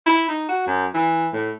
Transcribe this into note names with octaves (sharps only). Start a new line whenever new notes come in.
E4
D#4
F#4
F#2
E3
A2